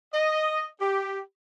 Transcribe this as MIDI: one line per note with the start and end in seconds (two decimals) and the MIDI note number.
0.14 0.66 75
0.80 1.20 67